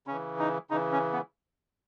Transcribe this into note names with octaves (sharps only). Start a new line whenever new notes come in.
C#3 E3 C#4
D#4
C#3 E3 D#4
C#4
B3